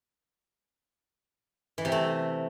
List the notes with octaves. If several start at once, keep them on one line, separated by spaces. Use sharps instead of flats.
E3
C3
A3